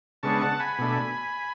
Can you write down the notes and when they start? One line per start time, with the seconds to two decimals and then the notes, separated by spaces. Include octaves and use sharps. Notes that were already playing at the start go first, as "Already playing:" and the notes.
0.23 C#3 G#3 B3 D4 A5 C#6
0.41 F#5 A5
0.60 G#5 B5
0.78 B2 A3 D4